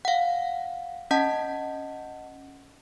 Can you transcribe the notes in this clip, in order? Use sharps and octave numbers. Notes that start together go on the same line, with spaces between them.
F5 F#5
C#4 D#5 F#5 A5